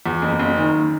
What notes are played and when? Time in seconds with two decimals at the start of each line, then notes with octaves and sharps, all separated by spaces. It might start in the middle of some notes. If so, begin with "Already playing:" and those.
0.06 E2
0.22 F#1
0.39 F#1
0.57 D#3